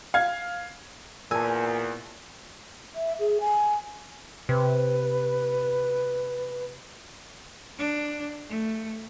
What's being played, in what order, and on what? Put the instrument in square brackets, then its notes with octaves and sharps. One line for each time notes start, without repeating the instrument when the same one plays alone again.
[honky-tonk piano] F5 G#6
[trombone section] E2 [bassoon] A#2 [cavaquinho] G#5 [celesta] A5 E6
[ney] E5
G#4
G#5
[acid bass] C3 [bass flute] B4
[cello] D4
A3